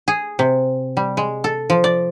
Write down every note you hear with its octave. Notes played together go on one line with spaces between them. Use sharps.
G#4
C3
G3
G#3
A4
F3
D5